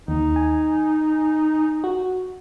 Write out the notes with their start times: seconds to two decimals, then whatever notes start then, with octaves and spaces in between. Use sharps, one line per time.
0.08 D#2 D#4
0.36 G#5
1.84 F#4